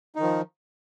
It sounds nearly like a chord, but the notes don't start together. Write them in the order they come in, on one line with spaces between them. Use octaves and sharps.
D#4 D#3 F3